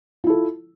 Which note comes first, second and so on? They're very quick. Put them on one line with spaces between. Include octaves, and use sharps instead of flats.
F4 E4 A4